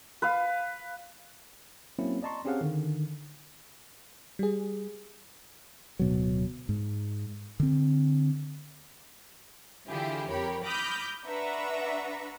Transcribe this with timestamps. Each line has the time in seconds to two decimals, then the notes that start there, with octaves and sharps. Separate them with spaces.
0.22 B4 F5
1.99 F#3 A#3 C4 C#4 E4
2.23 D5 D#5 A5 A#5 C6 C#6
2.45 C4 C#4 G4 G#4 F5 F#5
2.61 D3 D#3
4.39 G3 G#4
5.99 D1 B2 F#3
6.69 G#2
7.60 D3 C4
9.89 D3 E3 E4 F4 G4 G#4
10.29 F2 G4 A#4 C#5 B5
10.64 B5 D6 D#6 F6 G6 A#6
11.26 D4 B4 E5 F#5 A#5 C#6